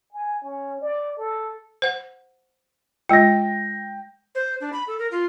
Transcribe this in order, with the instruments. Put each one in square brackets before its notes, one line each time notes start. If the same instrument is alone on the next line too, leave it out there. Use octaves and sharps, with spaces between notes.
[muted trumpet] G#5
C#4
D5
A4
[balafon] C5 F#5
[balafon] G#3 F4 [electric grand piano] G5 A#6
[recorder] C5
D4
B5
A4
A#4
F4